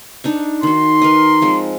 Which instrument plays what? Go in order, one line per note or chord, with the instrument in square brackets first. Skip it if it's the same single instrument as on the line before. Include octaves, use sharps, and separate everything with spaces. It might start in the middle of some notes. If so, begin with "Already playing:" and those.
[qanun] D4 D#4 C#6
[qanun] D#3 F#4 [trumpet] C6
[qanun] A#4 B4 D#5
F3 G#3 C4